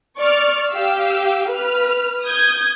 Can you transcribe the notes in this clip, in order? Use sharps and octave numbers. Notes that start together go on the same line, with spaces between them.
D5 C#6 F6
G4 F5 E6
B4 F6
D#6 G6 G#6